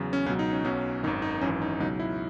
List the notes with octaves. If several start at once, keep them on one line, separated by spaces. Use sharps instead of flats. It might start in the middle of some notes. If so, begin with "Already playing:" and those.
Already playing: E2 C#3 F#3
C#4
C#2 B2 F#3 C#4
D#4
C#4
B1 B2 F#3 C#4
G#1 F#2 D#3 D#4
D#4
G#1 F#2 E3 C#4
D#4
C#2 B2 F#3 D#4
E4